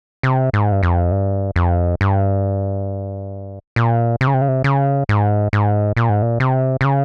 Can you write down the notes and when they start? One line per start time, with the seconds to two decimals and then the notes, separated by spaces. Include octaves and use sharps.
0.23 C3
0.53 G#2
0.72 G2
0.83 F2
1.12 G2
1.56 F2
2.01 G2
3.76 A#2
4.21 C3
4.27 C#3
4.34 C3
4.41 C#3
4.48 C3
4.64 C#3
5.09 G#2
5.53 G#2
5.97 A#2
6.09 G#2
6.22 A#2
6.40 C3
6.81 C3
6.84 C#3